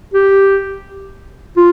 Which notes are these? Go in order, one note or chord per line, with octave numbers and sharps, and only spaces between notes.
G4
F4